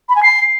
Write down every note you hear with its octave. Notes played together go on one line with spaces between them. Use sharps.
B5
G#5
C7